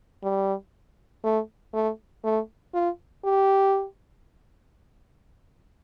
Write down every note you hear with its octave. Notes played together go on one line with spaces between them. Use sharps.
G3
A3
A3
A3
F4
G4